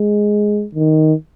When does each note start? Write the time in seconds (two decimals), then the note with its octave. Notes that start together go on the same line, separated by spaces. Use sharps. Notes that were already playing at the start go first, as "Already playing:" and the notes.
Already playing: G#3
0.75 D#3